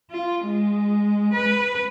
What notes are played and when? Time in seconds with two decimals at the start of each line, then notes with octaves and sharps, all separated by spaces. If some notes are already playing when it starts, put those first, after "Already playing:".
0.11 F4
0.45 G#3
1.33 B4